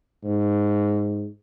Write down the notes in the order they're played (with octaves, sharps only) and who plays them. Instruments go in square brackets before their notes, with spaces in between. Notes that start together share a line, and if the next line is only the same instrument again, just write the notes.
[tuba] G#2